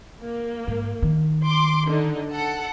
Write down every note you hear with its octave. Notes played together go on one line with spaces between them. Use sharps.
A#3
G#2
D#3
C6 D6
D3 D#4
A4 F#5